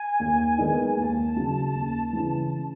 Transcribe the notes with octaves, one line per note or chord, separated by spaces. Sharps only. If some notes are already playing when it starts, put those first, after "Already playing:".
Already playing: G#5
D#2
D#3 G#3 B3 D#4
D#2 A5
C#3 F#3
D#2
C#3 E3